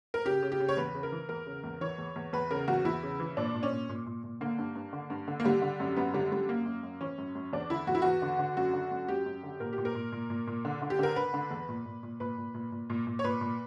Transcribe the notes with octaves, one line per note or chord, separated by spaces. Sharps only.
A#4
C#3 G4
C#3
G4
C#3
C#5
E2 B4
C#3
A#4
E3
E2 A#4
C#3
E2
E3 C#5
E2
E2
E2 B4
C#3 A#4
E2 F#4
E2 E4
C#3
E3
A#2 D4
A#2
C#4
A#2
A#2
A#2
A#2
D3 A#3
G2
G2
D3
G2
D3
A#3
D3 G3
D3
F#2
F#2 B3
D3 G3
F#2 G3
F#2 A#3
F#2
F#2
E3 C#4
F#2
F#2
E2 D4
D3 E4
E2 F#4
E4
E2 F#4
D3
D3
F#2 F#4
D3
F#2
F#2 G4
F#2
D3
A#2 A#4
G4
A#2
A#4
A#2
A#2
A#2
A#2
D3
D3
G4
D3 A#4
D3 B4
D3
E2
A#2
A#2
A#2
A#2 B4
A#2
A#2
A#2
A#2
A#2
C#5
A#2 B4
A#2